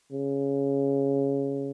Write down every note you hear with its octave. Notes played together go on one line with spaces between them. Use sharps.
C#3